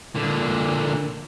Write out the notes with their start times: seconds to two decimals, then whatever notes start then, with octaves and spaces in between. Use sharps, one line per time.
0.15 A#2 D3